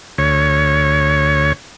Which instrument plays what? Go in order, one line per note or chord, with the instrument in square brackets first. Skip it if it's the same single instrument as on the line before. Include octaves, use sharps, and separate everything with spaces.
[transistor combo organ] D2 C#5